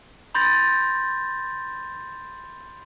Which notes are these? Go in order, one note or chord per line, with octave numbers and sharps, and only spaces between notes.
B5 C6 G6 A6 A#6